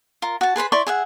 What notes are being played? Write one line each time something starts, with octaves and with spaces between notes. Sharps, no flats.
F4 A#4
F#4 A5
G#4 B4 C5 B5
E4 D5 C6 C#6
G#4 E5 F#5